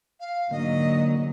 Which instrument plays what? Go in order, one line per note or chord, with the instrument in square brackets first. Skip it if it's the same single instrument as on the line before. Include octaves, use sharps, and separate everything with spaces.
[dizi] F5
[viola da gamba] G#2 F#3 [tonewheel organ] D3 A#3 [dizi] D#5